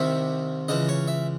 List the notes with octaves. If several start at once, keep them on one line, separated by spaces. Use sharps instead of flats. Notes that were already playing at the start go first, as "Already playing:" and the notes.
Already playing: C2 C3 D#3 E5
C#2 C#3 E3 D#5
C#5
E5